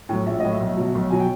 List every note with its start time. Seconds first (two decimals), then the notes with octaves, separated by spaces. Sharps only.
0.09 A2 F#3
0.26 A#1 E5
0.40 A2 F#3 D#5
0.53 E5
0.61 B1
0.77 B2 F#3
0.95 B1
1.10 B2 F#3 G#5
1.20 G5